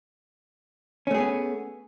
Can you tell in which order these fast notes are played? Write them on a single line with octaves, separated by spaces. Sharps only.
C#4 A3 G#4 B3